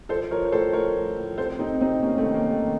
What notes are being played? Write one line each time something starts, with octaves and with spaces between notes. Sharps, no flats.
F3 A4 C5
F3 A#4 C#5
C#5
A2 A4 C5
A2 A#4 C#5
F3
A2
C3 A4 C5
C3 C4 D#4
C3 C4 D#4
C3 A#3 C#4
A3 C4
D#3
A#3
D#3
A3